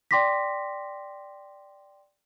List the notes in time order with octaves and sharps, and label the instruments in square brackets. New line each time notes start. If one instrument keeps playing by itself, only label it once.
[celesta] D5 G5 C6 D6 A#6 B6